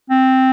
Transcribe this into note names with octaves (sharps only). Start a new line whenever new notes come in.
C4